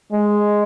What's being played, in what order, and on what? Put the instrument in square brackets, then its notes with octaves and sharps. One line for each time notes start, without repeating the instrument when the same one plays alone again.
[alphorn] G#3